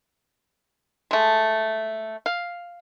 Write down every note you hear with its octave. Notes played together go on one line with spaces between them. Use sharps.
G#3 A3
F5